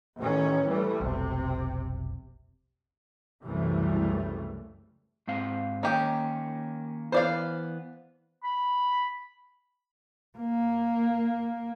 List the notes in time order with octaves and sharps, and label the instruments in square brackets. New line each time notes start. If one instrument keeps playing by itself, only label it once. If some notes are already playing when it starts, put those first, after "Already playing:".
[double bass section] A1 D#3 C#4
E3 G3 A3
[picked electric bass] F1 B1 [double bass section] C3
[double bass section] C2 F#2 C#3 E3 G3 A3
[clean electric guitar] G#2 C4 F5
[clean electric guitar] D#3 A#3 C#4 [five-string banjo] D#4 G4
[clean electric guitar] E3 B3 [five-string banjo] C5 D5 F5
[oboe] B5
[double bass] A#3